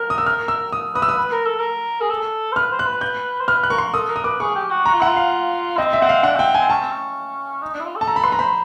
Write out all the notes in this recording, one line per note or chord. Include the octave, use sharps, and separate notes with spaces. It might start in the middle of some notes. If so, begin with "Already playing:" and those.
Already playing: A#4 F6
D#6
E6
F6
E6
D#6
B4 D#6
E6
D#6
B4
A#4
A4
A#4
G#4
A4
C5
B4 F6
C5
F#6
B4
G6
C5
B4 F6
F#6
A#4 C#6
C6
A4 D#6
A#4
D#6
B4 D6
G#4 C#6
G4
F#4
F#4 A#5
F4
E4 F#5
F4
F5
C4 D#5
E5
C4 F#5
F5
D4 F#5
C4 G5
C4 G#5
C#4 A5
C4
C#4
D#4
D4
E4
F4
A4
A5
A4 A#5
B5
B4 C6
A#5
C5 B5